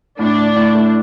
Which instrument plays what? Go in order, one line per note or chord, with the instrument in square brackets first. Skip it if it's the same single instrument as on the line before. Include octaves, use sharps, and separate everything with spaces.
[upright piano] A2 [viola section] D4
[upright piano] A2
A2
A3